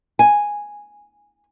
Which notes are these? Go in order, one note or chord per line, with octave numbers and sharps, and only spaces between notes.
G#5